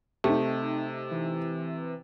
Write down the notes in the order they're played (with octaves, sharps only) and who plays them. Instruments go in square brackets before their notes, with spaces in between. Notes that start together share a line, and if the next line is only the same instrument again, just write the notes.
[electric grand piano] C3 [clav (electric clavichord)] A3 [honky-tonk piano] D#4 G4
[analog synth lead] E3